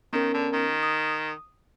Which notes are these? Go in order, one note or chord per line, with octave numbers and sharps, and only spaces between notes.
D#3 B3 C#4 A#4
D3
D#3
D#6